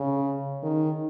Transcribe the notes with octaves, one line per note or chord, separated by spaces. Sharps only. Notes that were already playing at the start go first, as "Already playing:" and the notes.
Already playing: C#3
D#3